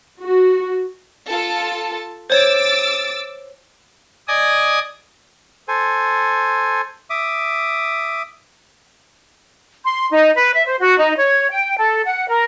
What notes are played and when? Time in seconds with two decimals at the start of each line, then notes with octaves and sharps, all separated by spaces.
0.21 F#4
1.28 F4 A4 A5
2.30 C5 C#5 D6 E6 A6
4.28 D5 D#5 G#5 D#6
5.68 A4 C5 G#5
7.10 E5 D6 D#6
9.84 C6
10.11 D#4
10.35 B4
10.53 E5
10.67 C5
10.81 F#4
10.98 D#4
11.17 C#5
11.51 G5
11.78 A4
12.05 F#5
12.28 A#4